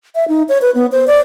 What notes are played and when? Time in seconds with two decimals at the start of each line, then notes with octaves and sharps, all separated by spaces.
0.15 E5
0.28 D#4
0.49 C#5
0.62 B4
0.75 B3
0.92 C5
1.07 D5